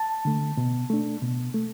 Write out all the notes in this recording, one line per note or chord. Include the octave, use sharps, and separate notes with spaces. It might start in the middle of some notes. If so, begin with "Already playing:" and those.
Already playing: A5
D3 A3
B2
A3 D4
B2
A3